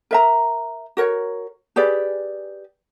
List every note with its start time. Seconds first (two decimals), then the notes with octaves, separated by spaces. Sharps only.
0.11 A#4 E5 A#5
0.97 F#4 A#4 C#5
1.76 G4 G#4 B4 D5